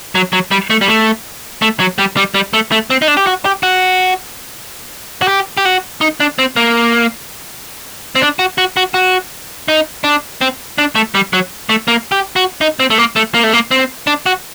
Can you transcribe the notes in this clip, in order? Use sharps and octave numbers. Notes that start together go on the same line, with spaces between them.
F#3
F#3
G3
A3
G3
A3
A3
F#3
G3
G3
G3
A3
A3
C4
D#4
D4
G4
F#4
G4
F#4
F#4
G4
G4
F#4
D#4
D4
C4
A#3
C4
D4
F#4
F#4
F#4
F#4
D#4
D4
C4
D4
A3
G3
F#3
A3
A#3
G4
F#4
D#4
C4
A3
A#3
A3
A#3
A3
A#3
C4
D4
F#4